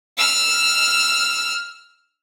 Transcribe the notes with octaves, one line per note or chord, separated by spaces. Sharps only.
E6 F6